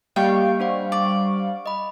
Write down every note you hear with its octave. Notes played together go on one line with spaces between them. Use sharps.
G3 A#3 G4 D#5 F5 G5 C#6
D4 C5 F#5
D5
D#5 B5